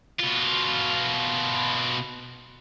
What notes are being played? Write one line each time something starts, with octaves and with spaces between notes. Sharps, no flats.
B2 F4